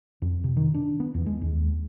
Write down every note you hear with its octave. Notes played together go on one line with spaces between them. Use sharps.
F2
C3
D#3
D4
B3
E2
G#3
D#2